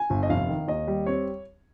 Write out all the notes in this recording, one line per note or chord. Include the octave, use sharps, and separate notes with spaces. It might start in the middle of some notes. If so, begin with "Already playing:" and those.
Already playing: G#5
G1
D#5
F1 F5
D#3
D#2 D#5
G3
C4 C#5